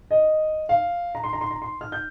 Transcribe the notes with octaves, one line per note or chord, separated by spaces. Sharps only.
D#5
F5
A#5
C6
A#5
C6
A#5
C6
F6
G6